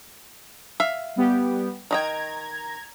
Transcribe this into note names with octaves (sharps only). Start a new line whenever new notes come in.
E5 F5
G3 B3 G4
D#3 D#5 G5 A#5 G#6